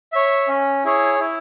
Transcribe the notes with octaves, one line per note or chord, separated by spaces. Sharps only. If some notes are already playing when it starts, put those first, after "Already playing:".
C#5 E5
C#4
E4 G#4 C#5
E4